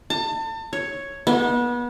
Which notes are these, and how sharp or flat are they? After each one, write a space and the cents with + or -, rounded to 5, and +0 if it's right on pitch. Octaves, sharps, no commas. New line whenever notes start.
A5 +35
C#5 +0
B3 -30